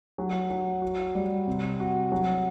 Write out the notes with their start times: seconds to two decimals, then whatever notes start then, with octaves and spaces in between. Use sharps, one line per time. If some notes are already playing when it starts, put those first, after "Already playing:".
0.18 F#3
0.50 F#3
0.82 F#4
1.15 G3
1.47 C3
1.80 F#4
2.12 F#3